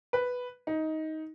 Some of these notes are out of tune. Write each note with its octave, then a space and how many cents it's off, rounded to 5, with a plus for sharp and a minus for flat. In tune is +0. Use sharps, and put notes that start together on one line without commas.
B4 +0
D#4 +15